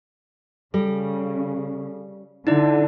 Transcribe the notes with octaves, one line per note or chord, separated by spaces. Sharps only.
C#3 G3 A4
D3 D#4 E4 D5